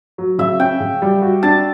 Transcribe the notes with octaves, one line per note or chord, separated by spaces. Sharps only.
F#3
C#3 E5
C#4 G5
C#3
G3
F#4
D4 A5